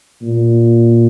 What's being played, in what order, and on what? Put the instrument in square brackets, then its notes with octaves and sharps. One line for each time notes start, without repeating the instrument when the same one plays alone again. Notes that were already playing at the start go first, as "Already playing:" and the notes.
[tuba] A#2